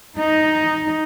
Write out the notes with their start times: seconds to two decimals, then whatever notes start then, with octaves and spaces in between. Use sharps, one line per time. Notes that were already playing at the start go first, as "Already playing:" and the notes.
0.17 D#4